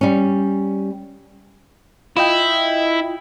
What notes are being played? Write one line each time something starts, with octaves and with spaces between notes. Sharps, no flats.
G3 C#4
E4 F4 D#5 G5